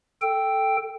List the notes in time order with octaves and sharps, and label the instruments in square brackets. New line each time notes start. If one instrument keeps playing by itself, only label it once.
[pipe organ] A4 G5